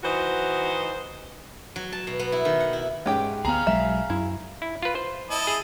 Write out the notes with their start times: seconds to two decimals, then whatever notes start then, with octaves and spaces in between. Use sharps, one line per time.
0.03 E3 D#4 F#4 C5
1.76 F#3
1.92 A5
2.07 B2
2.19 B3
2.32 E4
2.45 D#3
2.60 F#5
2.73 E4
3.06 G#2 C#4 G4 G5
3.45 D2 B3 G#4 F5 A#5
3.67 B1 F#3 G#3 E5
4.10 F#2 E4
4.62 E4
4.83 F4 B4
4.95 C5
5.30 E4 D#5 A5
5.47 G#4